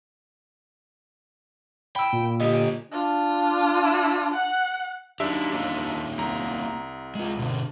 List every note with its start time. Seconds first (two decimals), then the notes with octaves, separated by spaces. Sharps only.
1.96 G5 B5 E6
2.13 A#2
2.40 D3 G4 D#5
2.92 D4 F4
4.34 F#5
5.20 F#2 D4 D#4 G4 E5
5.53 A#3 C#4 D#4
6.18 C2 A#5
7.15 G#3 F4
7.39 B2 D3